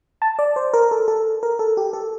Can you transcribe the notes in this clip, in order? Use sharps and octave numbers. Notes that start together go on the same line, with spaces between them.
A5
D5
C5
A#4
A4
A4
A#4
A4
G4
A4